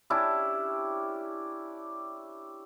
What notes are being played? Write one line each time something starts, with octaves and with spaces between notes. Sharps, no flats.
C#4 D4 E4 G4